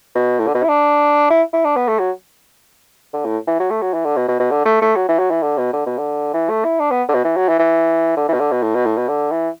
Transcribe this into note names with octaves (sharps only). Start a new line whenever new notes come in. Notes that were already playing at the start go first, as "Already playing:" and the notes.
B2
A2
D3
B2
E4
D4
E4
E4
D4
B3
A3
F#3
D3
A2
E3
F#3
A3
F#3
E3
D3
B2
B2
B2
D3
A3
A3
F#3
E3
F#3
E3
D3
B2
D3
B2
D3
E3
A3
E4
D4
B3
D3
B2
E3
F#3
E3
E3
D3
E3
B2
D3
B2
A2
B2
A2
B2
D3
E3